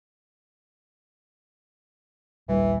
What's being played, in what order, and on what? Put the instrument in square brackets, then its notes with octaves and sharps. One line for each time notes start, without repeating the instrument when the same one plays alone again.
[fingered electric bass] D#1 A#1 G3 [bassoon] E3